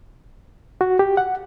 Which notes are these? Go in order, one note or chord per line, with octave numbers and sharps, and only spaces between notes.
F#4
G4
F#5